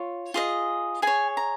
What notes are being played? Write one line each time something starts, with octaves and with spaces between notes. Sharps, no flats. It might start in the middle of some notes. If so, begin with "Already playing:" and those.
Already playing: F4 C#5
F4 G#4 D#5
G#4 C#5 G#5
A#5